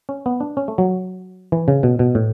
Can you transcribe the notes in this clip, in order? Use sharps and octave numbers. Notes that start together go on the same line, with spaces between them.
C#4
B3
D4
C#4
A3
F#3
E3
C#3
B2
B2
A2